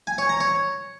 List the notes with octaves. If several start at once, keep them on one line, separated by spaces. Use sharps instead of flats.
G#5
C#5
A#5
C#5